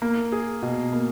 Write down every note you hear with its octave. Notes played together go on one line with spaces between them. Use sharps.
A#3
G#4
B2
A#3